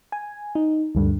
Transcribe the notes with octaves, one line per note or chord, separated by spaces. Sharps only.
G#5
D#4
D2 G2 D3